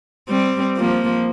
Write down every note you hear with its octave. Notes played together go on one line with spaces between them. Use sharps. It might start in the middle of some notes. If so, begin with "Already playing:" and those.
G3 C4
F3 A#3